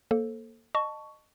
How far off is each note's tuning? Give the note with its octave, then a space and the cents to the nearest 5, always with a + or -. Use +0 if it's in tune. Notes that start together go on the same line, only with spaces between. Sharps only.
A#3 +0 A4 +0 C5 +25
D#5 -25 A5 +0 C#6 +15